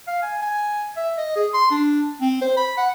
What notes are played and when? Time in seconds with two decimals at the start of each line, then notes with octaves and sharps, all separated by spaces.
0.07 F5
0.23 G#5
0.42 G#5
0.96 E5
1.17 D#5
1.36 G#4
1.54 C6
1.71 D4
2.21 C4
2.42 C5
2.57 B5
2.77 F#5